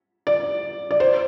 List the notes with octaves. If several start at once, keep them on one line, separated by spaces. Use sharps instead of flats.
D5
D5
C5